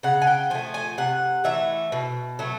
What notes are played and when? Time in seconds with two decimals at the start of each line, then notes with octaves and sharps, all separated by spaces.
0.03 C#3 F#5
0.22 G#5
0.27 G5
0.50 F3 A3 G#5
0.74 G#5
0.98 C3 F#5
1.44 E3 A3 E5
1.92 B2
2.39 F#3 A3